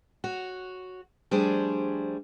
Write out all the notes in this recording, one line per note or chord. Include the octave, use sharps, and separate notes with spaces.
F#4 C#5
F3 G3 A3 D4 G#4 C5